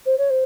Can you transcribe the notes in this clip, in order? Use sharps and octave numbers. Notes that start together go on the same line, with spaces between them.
C5
C#5
C5